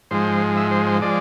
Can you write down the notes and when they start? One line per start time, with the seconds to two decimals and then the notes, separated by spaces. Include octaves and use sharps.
0.11 G#2 F3 G#3 C5
0.57 E5
0.71 C5
0.87 C5
1.02 F3 G#3 D5